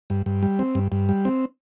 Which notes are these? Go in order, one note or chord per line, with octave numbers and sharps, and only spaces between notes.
G2
G2
G3
C4
G2
G2
G3
C4